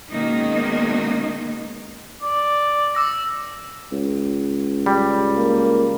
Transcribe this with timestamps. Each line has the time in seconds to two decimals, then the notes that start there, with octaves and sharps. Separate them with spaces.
0.10 B2 D#3 G#3 A#3 C#4 D#4
2.22 D5
2.95 D6 E6 A#6
3.92 C#2
4.86 G3
5.37 A#3